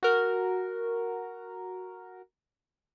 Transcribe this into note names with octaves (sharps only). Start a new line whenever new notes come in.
F#4 A#4